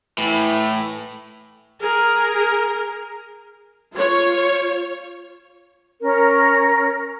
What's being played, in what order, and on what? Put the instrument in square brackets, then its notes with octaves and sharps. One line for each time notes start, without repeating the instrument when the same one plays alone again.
[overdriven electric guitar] A2 [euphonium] E3
[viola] G#4 A#4
[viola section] F4 C#5
[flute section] C#4 A#4